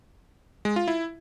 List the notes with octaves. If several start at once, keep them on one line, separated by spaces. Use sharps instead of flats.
G#3
F4
E4